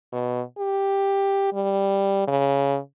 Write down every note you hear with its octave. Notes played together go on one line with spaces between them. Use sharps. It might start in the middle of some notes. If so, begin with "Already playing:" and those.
B2
G4
G3
C#3